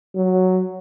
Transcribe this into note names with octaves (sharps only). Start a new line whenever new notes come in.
F#3